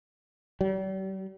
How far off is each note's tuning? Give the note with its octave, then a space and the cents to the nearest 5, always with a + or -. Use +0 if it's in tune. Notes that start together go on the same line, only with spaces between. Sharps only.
G3 -40